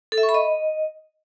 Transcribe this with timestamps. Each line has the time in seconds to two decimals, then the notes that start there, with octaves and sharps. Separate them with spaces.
0.12 A4
0.18 E5
0.23 C#6
0.29 B5
0.34 D#5